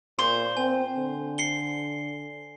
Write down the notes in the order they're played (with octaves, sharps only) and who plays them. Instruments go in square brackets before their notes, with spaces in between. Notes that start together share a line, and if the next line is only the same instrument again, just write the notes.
[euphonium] A#2 [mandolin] C5
[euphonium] C4 [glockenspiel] G#5
[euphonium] D3
[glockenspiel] C7 C#7 G7